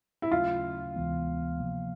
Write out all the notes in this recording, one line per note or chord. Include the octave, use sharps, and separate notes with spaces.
E4
D#2 C#3 F#3 A3 C#4 F4
D2 C3 E3 G#3 B3
C3 F3 A#3